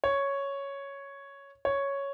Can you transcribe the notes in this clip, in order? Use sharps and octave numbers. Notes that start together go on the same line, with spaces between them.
C#5
C#5